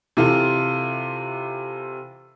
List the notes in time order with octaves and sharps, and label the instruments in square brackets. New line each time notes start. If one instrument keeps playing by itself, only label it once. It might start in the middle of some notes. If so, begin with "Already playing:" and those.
[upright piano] C3 E3 F4 A4